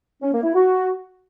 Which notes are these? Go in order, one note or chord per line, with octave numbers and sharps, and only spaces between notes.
C#4
A#3
E4
F#4